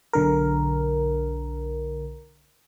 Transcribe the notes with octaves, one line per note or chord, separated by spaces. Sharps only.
B1 D3 A#4